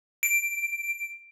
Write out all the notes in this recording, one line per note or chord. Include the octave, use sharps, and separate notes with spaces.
D7